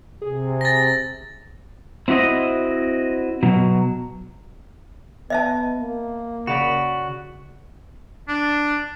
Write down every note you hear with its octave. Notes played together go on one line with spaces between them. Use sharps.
C3 G#4
A6 A#6
C4 E4 F#4 C#5 D#5
B2 F#3
B3 D#5 E5 A5
A#3
C#3 F#4 D5 B5 B6
D4